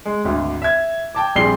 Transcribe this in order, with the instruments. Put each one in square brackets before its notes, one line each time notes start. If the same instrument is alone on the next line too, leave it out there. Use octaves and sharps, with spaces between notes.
[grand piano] G#3
G#1 D2
E5 G#6
G5 A5 D6
A#1 G3 C4 G#4 C7 G7